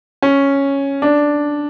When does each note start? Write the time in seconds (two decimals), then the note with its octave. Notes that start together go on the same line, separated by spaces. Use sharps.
0.22 C#4
1.02 D4